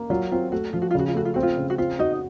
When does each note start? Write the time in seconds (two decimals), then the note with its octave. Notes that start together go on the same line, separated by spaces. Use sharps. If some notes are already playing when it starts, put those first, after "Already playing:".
Already playing: A#3
0.10 F#3 F4
0.31 C4 F4
0.52 A3 F#4
0.73 F3 F4
0.82 F#4
0.91 F4
0.95 C#3 F#4
1.08 F4
1.15 A3 F#4
1.25 F4
1.34 C4 F#4
1.43 F4
1.57 C#3
1.70 F#4
1.78 C4 F4
1.99 D#4 F#4 D#5